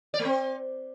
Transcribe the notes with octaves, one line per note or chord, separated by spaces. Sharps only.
D5
A3
C4